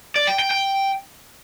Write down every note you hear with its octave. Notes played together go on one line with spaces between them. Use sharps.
D5
G5
G5
G5